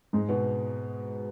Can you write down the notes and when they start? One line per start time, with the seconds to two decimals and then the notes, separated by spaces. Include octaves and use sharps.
0.13 G#2 G#3
0.29 B2 B3